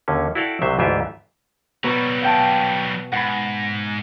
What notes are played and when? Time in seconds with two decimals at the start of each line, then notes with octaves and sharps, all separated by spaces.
0.08 D#2 D3 C#4
0.35 E4 F#4 A4 D5 F5 G5
0.62 C2 C3 F#3 C5 E5
0.79 D2 G#2 E3 F4 G4 E5
1.84 B2 F#3 G3 B4 A#5
2.22 F5 G5 A5
3.12 G#2 F#5 B5